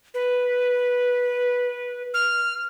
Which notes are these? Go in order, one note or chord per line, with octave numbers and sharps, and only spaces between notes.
B4
F6